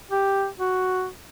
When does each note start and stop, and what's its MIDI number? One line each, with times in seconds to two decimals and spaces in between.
0.11 0.48 67
0.60 1.08 66